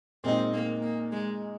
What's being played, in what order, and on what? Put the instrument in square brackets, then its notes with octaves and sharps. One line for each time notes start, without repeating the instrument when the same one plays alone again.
[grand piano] A#2 G#3 D#4 [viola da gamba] C4
[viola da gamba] A#3
A#3
G#3